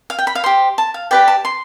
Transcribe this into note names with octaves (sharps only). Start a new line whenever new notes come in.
F5
G5
B5
F5
G4 C5 C6
A5
F5
G4 B4 D5 G5
A5
C6